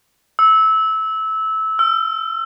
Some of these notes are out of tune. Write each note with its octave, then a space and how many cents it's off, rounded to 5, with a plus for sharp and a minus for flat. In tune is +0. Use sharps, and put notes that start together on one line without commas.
E6 -20
E6 +40